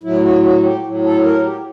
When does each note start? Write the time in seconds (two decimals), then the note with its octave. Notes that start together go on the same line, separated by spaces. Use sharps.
0.03 A2 F#3 E4
0.23 F#4
0.43 F#4
0.63 G4
0.84 A2 F#3
1.03 A4
1.23 A#4
1.43 G4